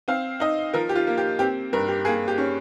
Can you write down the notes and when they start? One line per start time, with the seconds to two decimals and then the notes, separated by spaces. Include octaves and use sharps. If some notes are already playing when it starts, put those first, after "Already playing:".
0.08 C4 F5
0.40 D#4 D#5
0.73 F3 A#4
0.89 G4
0.95 F4
1.07 A#3
1.18 G4
1.39 C4 G4
1.73 G2 A#4
1.88 G4
2.05 A#3 G#4
2.28 G4
2.38 C#4